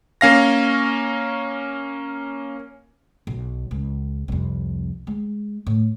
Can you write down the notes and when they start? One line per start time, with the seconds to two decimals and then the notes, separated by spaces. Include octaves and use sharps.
0.21 A#3 C#4 F5 A#6
3.27 B1
3.71 C#2
4.28 C2 F2
5.07 G#3
5.67 A2